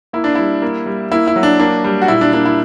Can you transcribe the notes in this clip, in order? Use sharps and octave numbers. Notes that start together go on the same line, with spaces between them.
A#3 E4
D4
G3 E4
A#3
G3
A#3 E4
E4
F#3
D4
A#3 D4
G3
F#4
A#2 E4
D4
A#3 D4
E4